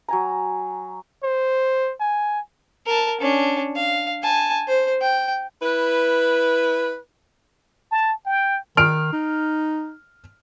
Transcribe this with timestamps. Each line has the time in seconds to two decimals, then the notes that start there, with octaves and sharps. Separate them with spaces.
0.08 F#3 G#5 A#5
1.23 C5
2.00 G#5
2.86 A#4 A5
3.21 C#4 D4
3.76 F5
4.22 G#5 A5
4.68 C5
5.01 G5
5.62 E4 B4
7.91 A5
8.25 G5
8.77 D#3 F6 D7
9.12 D#4